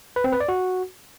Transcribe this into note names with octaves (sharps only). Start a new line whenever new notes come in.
B4
C4
B4
D5
F#4